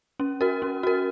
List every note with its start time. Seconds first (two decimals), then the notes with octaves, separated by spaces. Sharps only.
0.20 C#4
0.41 F#4 A#4
0.62 C#4
0.83 F#4 A#4